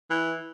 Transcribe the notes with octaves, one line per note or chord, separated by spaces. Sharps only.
E3